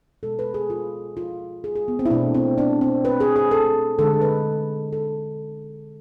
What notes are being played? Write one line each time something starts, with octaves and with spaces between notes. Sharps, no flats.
B2 G#3 A4
B4
G#4
F4
F4
G#4
G#4
B3
C4
E4
B2 A3 D4
C4
D4
C4
B4
G#4
G#4
A4
D3 G#3 A4
B4
A4